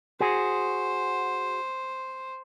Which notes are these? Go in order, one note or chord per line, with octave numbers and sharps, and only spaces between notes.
F#4 G#4 C5